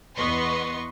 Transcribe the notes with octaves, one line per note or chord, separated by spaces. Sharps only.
E2 B3 B4 D#5 C6 C#6